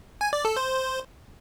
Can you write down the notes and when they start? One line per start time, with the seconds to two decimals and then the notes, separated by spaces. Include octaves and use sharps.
0.21 G#5
0.33 D5
0.45 A4
0.56 C5